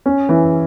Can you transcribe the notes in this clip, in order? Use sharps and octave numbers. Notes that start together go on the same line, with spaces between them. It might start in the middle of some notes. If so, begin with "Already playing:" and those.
C#4
E3